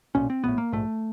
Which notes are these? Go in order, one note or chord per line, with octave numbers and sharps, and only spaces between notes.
B1 A#2 C#4
C4
A#1 A2 B3
A#3
A#1 G#2 A3